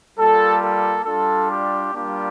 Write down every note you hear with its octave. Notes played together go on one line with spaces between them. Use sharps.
G3 A#3 F4 A4
A4
G3 D4 F4 A4
G4
G3 A#3 D4 F4 G4